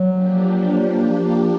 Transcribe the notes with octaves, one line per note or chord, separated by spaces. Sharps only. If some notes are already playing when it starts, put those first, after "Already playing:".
Already playing: F#3
F3 A#3 D4 G4